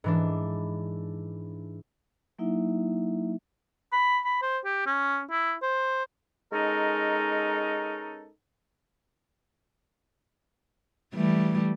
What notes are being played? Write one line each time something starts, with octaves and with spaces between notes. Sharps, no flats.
G#2 E3 D4
F#3 A#3 D#4 E4 E5
B5
B5
C5
G4
C#4
E4
C5
G#3 C#4 D#4 A4 A#4
E3 G3 A3